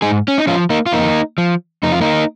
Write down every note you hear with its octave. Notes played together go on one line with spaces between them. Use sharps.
G#2 D#4 G#4
C#4
D#4
F3 C#4 F4
A#3 D#4
F4
F2 A#3 D#4
F3
F2 D#4
F4
A#3 D#4